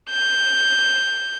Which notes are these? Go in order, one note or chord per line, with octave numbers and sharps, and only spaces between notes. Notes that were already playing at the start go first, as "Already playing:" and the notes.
G6